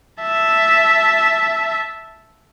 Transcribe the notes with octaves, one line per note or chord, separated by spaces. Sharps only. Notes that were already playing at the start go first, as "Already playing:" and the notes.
E5 A5